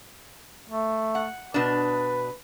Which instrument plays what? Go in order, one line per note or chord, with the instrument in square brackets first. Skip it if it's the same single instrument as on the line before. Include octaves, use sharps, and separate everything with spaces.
[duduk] A3
[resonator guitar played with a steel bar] F#5
[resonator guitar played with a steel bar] B2 D4 [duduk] B4